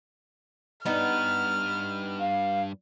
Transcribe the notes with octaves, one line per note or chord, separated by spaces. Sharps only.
G2 B3 D#4 B4 F6
F5